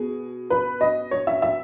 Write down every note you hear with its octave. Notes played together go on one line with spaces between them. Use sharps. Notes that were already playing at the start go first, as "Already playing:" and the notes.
Already playing: B2 G#4
B4
D#5
C#5
E5
E5